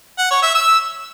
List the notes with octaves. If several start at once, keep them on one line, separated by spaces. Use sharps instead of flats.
F#5
C#5
E5
E6